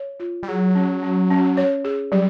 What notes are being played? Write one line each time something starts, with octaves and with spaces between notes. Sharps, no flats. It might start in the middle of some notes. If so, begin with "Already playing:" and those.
Already playing: C#5
F4
G3
F#3 G#4
C#4
C#4
C#4
C#5
G#4
F#3 G3